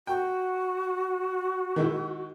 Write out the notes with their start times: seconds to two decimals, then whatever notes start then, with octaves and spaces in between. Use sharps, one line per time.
0.07 F#4 G5
1.76 D#3 G#3 E4